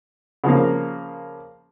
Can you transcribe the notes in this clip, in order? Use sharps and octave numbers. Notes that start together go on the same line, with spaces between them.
C#3 F3 A#3